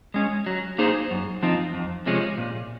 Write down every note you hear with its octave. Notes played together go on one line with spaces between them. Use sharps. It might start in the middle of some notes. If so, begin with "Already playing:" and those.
G#3 C#4
F#3
A#3 D#4 G#4 C5
F#2
F3 C4 D#4
F2
C3 F3 G#3 C#4
A#2